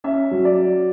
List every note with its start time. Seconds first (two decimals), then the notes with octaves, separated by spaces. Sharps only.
0.04 C#4 E5
0.31 F#3
0.45 D5